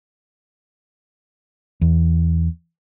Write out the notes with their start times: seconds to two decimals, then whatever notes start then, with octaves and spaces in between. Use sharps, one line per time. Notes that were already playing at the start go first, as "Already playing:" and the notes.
1.81 E2